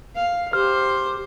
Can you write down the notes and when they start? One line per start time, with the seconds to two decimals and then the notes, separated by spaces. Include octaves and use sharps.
0.16 F5
0.53 G4 C5 F6